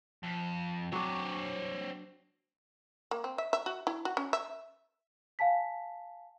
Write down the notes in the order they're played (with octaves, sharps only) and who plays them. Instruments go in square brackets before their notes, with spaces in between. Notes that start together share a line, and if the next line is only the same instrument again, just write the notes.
[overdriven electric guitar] F2
[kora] F#3 D4 [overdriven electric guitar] C4 C#5
[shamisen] A#3
C4
E5
E5
F#4
E4
F#4
C#4
E5
[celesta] F5 G#5 A5 B6